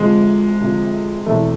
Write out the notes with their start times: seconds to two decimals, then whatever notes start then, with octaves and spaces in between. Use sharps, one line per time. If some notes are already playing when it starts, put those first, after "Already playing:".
Already playing: D2 C3 F3 G#3
0.60 D2 C3 F3
1.26 E1 E2 C3 E3 A3